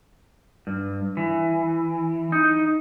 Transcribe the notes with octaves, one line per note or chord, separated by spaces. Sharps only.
G2
E3
D#4